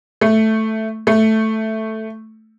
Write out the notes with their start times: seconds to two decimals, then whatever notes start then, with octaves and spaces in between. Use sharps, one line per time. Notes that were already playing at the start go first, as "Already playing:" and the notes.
0.21 A3
1.07 A3